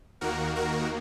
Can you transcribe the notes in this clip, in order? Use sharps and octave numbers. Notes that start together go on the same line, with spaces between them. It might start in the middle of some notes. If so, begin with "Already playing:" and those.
D#2 D#3 A#3 F#4 A#4
F#4 A#4